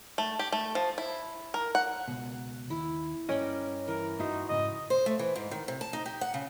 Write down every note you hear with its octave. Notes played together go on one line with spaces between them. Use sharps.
A3
G4
A3
F3
E4
A#4
F#5
C#2 B2
D#2 E4
G2 C#4 A#4 D5 D#5 G5
E3 A#4
G2 E3 D#4 E4 F#4 C5 E5
F2 G#2 C#3 D#5
C5
A3
E3
G#2
D#3
C3
A5
D#4
G4
F#5
C#3